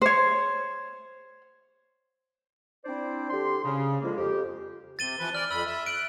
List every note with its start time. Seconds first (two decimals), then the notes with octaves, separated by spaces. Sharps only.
0.02 C5 C#5
2.84 C4 D4 E4 C5 D5
3.30 D3 G4 C6
3.65 C#3
4.01 D3 F3 G#3 A#3
4.17 F2 G4
4.99 C3 A6 D#7 G7
5.19 E3 F3 B4
5.35 D5 F6
5.51 F2 B5 E6
5.66 E5
5.86 F#6 D7